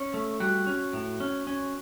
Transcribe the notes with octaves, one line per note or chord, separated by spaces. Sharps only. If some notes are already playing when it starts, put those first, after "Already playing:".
Already playing: C#4
A3
G3 F#4
C#4
A2
C#4
C#4